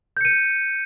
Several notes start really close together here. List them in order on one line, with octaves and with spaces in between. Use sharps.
G6 C#7 D#7